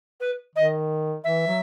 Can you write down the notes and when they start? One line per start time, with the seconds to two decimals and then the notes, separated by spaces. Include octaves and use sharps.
0.20 B4
0.55 D#3 D#5
1.24 E3 E5
1.47 F#3